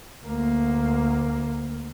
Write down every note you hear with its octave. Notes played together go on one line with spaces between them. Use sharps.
D2 A#3